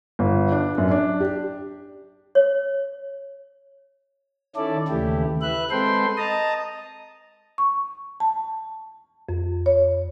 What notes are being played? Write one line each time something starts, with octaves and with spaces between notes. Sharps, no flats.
G1
D4
F#2
D4
G4
C#5
D#3 C#4 E4 A4 D5
D#2 C#3 E3 A3 E4 G4
B4 E5 F#6
G#3 C4 A4 B4 G5 C6
D#5 A5 A#5 D#6
C#6
A5
F2
C#5